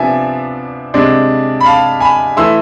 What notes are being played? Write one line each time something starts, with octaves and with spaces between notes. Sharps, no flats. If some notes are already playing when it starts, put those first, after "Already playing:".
Already playing: C3 F3 B3 D4 E5 G#5
C3 G#3 D4
B5
F5 A5
G#5 B5
E3 A3 E4 C6 E6